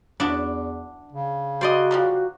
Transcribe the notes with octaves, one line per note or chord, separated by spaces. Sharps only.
E2 B3 D4 E4 F#4
C#3
G3 F#4 C5 D5 D#5
F3 G3 A#3